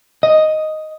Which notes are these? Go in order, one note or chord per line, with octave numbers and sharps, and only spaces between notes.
D#5